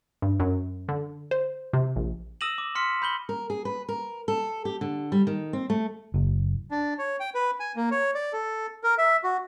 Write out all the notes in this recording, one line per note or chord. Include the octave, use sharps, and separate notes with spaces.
G2
F#2
D3
C5
C3
A#1
D#6 E6 A#6 D#7 E7 F#7
D6
C6 F6 B6 C#7
B5 G6 F#7 G7
A#4
G#4
B4
A#4
A4
G4
D3
G3
D#3
C4
A3
F#1
D4
C#5
G5
B4
G#5
A#3
C#5
D5
A4
A#4
E5
F#4